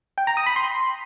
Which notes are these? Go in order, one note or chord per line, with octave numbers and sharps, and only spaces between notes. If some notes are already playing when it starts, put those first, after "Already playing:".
G5
A#5
D#6
B5
C6